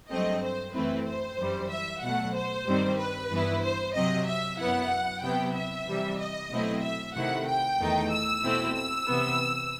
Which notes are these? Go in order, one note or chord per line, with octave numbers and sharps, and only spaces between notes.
G2 F#3 A3 C4 D#5
C5
F#2 E3 A3 C4 E4 B4
C5
F#2 E3 G3
E5
B2 F#3 A3 F#5
C5
G2 D#3 G3 C4
B4
G2 E3 B3 E4
C5
C3 F#3 C4 D#5
E5
F#2 F#3 B3 E4 F#5
C3 F#3 B3 E4 G5
E5
C3 E3 G3
D#5
B2 F#3 A3 C4 E4
E5
C3 D#3 A3 E4 F#5
G5
E2 D#3 A3 D#4
E6
B2 A3 C4 E4
E6
C3 E3 B3